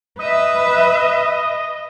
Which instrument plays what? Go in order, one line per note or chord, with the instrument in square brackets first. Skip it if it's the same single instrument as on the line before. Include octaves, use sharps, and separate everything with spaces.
[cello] B4 E5 [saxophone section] D#5